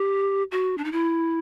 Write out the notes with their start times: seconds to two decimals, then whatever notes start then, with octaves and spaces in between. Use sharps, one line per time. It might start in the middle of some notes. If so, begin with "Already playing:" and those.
Already playing: G4
0.52 F#4
0.78 D4
0.84 D#4
0.92 E4